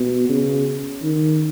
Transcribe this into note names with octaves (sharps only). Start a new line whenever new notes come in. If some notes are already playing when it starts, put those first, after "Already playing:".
Already playing: B2
C#3
D#3